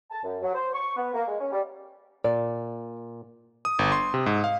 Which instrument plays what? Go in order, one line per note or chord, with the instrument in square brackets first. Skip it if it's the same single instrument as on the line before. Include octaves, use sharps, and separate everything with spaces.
[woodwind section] A5
F#2
F#3
C5
C#6
B3
A#3
G#3
C#4
G3
[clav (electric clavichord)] A#2 [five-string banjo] D5
[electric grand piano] D#6
G1
C6
C3
G#2
F5